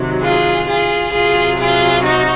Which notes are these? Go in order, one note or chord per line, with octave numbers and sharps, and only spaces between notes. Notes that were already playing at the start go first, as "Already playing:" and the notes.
Already playing: C3 D#3 F#3
F4 G#4
F4 G#4
C3 F#3 F4 G#4
F4 G#4
D#4 F#4